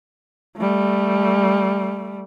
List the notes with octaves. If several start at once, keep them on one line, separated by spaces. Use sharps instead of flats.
G3 A3